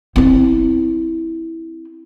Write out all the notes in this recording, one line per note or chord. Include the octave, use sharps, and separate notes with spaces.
C4 E4